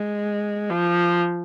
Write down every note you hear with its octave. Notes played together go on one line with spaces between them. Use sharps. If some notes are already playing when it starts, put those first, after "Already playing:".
Already playing: G#3
F3